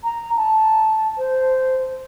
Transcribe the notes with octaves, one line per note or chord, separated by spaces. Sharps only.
A#5
A5
C5